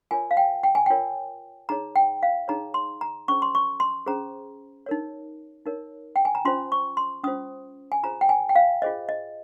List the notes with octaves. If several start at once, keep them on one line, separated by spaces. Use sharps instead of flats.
F4 A#4 C#5 G#5
F5
G5
G5
G#5
F4 A#4 C#5 G5
D#4 G#4 C#5 A#5
G5
F5
D#4 G#4 C#5 A#5
C6
A#5
C#4 G#4 C5 C#6
C6
C#6
C6
C#4 G#4 C5 A#5
D#4 A#4 C#5
D#4 A#4 C#5
G5
G#5
A#5
C#4 F4 C5 C6
C#6
C6
C#4 F4 C5 D#6
G#5
F4 G#4 C5 A#5
G5
G#5
G5
F5
F4 G#4 C5 D#5
D#5